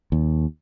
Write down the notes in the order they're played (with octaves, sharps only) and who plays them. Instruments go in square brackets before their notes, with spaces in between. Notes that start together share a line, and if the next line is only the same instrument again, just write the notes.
[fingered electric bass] D#2